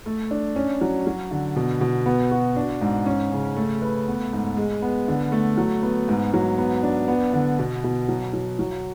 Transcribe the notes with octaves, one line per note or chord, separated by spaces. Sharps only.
A3
D4
C#4
F#3
F#3
D3
B2
B2
B3
F#4
D4
G#2
C#4
C#3
A3
B4
B3
G#2
G#3
B3
D3
A3
F#3
B3
G#2
F#3
B3
D4
B3
D3
B2
B2
F#3
F#3
F#3